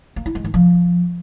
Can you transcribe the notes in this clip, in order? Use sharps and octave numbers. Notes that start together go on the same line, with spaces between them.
A#3
E4
G#3
D#3
F3